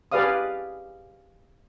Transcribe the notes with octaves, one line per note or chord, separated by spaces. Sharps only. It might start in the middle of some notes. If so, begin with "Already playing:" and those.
G4 G#4 B4 D5 F5 D#6